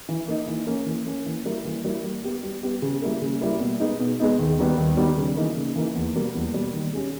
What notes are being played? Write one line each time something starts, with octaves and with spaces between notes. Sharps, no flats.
E3
A#3 D#4
E3
A#3 C#4
E3
A#3 C#4
E3
G3 A#3 E4 A#4
E3
G3 A#3 E4 A#4
G3
B3 G4
G3
B3 G4
C#3
G3 A#3 E4 A#4
C#3
G3 A#3 E4 A#4
B2
G#3 B3 D#4
B2
G#3 B3 D#4
D#2
D#3 G3 B3
D#2
D#3 G3 B3
C#3
E3 A#3 D#4
C#3
E3 A#3 D#4
E2
B2 G3 A#3
E2
B2 G3 A#3
D#3
G#3 C#4 G4